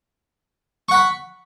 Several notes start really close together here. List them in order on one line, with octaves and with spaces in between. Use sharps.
C#6 F#5 B5